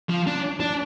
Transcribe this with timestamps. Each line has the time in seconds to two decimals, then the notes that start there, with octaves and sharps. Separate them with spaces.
0.10 F3
0.27 D4
0.60 D4